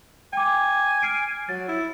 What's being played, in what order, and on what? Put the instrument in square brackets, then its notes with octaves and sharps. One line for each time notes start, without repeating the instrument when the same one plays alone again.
[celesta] G5 D6 [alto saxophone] G#5
[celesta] F6 C7 D7
[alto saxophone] F#3 [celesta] A6
[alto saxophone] E4